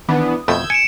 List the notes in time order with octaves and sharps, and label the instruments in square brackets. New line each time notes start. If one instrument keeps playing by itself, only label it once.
[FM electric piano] D#3 [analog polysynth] E3 B3 D4
[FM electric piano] D#6
[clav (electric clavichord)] F2 B2 A3 [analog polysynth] E6 G6 G#6
[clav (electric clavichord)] G#5 [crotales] C#7 D7 E7